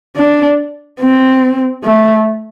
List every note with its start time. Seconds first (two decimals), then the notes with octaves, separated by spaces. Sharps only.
0.16 D4
1.00 C4
1.84 A3